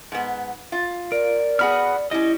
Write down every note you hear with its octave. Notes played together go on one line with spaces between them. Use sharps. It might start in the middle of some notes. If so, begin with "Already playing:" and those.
G#2 B3
F4
A#4 D5
B3 F#4 G#4 F#5 B5 F6
G3 C#4 E4 D#5